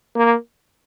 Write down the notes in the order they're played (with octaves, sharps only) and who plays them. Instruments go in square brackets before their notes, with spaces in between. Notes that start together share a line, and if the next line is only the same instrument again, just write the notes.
[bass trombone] A#3